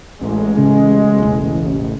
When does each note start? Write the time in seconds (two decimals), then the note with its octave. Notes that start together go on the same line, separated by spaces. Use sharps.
0.21 A1 D2 G#3
0.57 C#3
1.18 E1 A#3